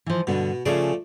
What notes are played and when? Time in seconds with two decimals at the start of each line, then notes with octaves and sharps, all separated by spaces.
0.06 E3 F3
0.27 G2 B2 D3 D4
0.66 C#3 F3 A3 G#4 D5